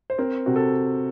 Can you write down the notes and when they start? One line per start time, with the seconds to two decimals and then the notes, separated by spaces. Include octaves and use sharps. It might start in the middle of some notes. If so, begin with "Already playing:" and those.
0.10 C5
0.18 C4 A#4
0.46 C3 F#4
0.56 A4